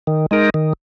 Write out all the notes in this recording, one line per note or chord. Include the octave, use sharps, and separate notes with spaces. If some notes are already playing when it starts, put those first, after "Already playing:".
D#3
G#3 D#4 A#4
D#3